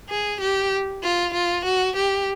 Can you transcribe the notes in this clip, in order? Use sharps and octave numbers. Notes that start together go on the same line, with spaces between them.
G#4
G4
F4
F4
F#4
G4